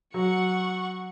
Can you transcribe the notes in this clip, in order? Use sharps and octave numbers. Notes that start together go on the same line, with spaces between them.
F#3 F#5 C#6